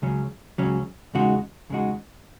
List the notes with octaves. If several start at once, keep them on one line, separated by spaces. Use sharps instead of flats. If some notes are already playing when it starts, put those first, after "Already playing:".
C#2 C#3 F#3 C#4
C#2 C#3 F#3 C#4
E2 C#3 G#3 D#4 F#4
E2 C#3 G#3 D#4 F#4